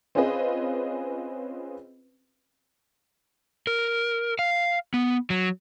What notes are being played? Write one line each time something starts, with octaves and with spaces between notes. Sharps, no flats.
C4 C#4 F4 G#4 B4 D#5
A#4
F5
B3
F#3